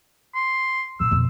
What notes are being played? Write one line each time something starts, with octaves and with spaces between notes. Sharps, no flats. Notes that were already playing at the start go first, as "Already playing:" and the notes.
C6
A#2 E3 E6
F2 B2